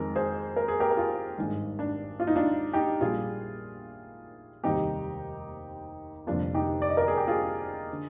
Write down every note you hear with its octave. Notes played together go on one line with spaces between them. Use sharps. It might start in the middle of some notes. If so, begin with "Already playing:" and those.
Already playing: F2 D#3 G#3 C4 A#4
G#4 C5
A#4
G#4
G4 A#4
A#4
F4 G#4
G#1 G2 D#3 G#3
D4
F4
D#4
D4 F4
D#4 G4
A#1 A#2 G3 F4 G#4
F1 D#2 D#3 G3 C4 D#4 G4
F1 F2 D3 G3 A#3 D4 F4
D#4 G4
D5
D#5
A#4 D5
G#4
G4
F4 G#4
D3